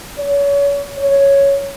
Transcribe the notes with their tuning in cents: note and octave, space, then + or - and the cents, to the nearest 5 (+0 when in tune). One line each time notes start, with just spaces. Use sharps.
C#5 +35
C#5 +0